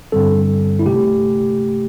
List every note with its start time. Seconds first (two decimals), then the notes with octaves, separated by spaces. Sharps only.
0.12 G2 D3 G3 C4 A4
0.79 E4
0.86 C3 A3 G4